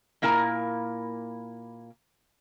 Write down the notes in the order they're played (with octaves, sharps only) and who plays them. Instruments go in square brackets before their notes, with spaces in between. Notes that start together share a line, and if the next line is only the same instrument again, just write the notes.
[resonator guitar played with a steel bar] A#2 A#3 E4 A#4 G#5